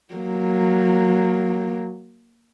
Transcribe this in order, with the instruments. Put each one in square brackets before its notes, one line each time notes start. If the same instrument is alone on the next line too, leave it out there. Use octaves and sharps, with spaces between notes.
[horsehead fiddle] F#3 A#3